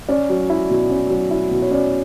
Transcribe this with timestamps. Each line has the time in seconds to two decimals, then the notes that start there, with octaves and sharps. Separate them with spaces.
0.09 C#4 D5
0.29 F#3
0.50 E4
0.70 B2
0.90 C#4
1.10 F#3
1.31 E4
1.51 B2
1.62 C#5
1.71 C#4 D5